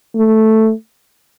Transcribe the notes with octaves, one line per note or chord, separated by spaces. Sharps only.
A3